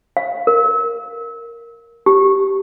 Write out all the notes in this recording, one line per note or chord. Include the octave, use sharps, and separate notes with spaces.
F5
A#4
G4